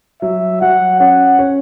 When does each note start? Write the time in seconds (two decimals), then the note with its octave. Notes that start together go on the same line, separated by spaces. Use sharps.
0.22 F#3 E5
0.61 F#3 F#5
1.00 C#4 F#5
1.39 C#4